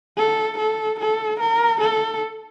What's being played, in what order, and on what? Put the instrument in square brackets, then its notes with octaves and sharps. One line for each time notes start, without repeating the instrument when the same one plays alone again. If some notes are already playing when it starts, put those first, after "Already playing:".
[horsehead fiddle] A4
A4
A4
A#4
A4